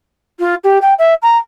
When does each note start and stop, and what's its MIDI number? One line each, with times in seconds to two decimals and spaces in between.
0.40 0.55 65
0.64 0.78 67
0.82 0.94 79
0.98 1.14 76
1.22 1.37 82